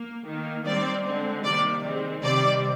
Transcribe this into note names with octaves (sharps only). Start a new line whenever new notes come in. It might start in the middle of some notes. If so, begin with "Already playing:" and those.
Already playing: A#3
D#3 A#3
D#3 G3 C4 D5
D3 G#3 C4
C3 D#3 G3 A#3 D5
D#3 G#3 C4
C3 D#3 G3 C4 D5